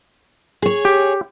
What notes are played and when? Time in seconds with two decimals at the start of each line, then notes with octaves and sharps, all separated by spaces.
0.62 G#4 C#5
0.85 G4